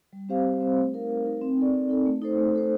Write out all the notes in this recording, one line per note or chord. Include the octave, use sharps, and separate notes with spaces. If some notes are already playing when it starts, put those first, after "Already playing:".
G3
C4 G4 C5 F5
G3
C4 G4 C5 F5
A3
D#4 A#4 F5
A3
D#4 A#4 F5
C4
D#4 A4 D5
C4
D#4 A4 D5
A3
D#4 A4 C5
A3
D#4 A4 C5